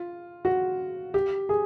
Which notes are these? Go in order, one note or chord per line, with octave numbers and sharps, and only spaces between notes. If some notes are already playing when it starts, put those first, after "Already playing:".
Already playing: F4
F#4
G4
G#4